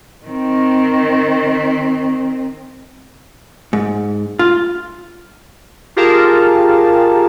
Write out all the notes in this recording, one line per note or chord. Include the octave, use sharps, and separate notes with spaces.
D#3 C4
G#2
F4
F4 G4 G#4 A#4 F5 A5